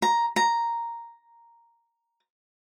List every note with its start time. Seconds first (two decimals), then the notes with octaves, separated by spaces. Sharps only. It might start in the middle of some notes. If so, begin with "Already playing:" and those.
0.02 A#5
0.36 A#5